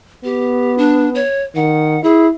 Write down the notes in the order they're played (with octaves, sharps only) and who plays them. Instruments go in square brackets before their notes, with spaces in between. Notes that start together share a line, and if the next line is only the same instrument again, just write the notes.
[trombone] B3 [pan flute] G4
[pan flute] D4
C#5
[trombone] D#3 [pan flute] F#5
[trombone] E4 [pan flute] G#4